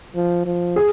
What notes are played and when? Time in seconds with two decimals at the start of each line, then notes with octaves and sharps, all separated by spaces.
0.16 F3
0.45 F3
0.76 G#4